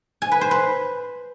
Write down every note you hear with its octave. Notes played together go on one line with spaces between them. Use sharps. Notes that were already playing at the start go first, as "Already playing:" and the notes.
G#5
B4
C5
B4